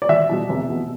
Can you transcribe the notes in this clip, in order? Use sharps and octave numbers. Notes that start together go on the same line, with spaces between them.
D5
E1 E5
E2 B2 G3
F1
E2 B2 B3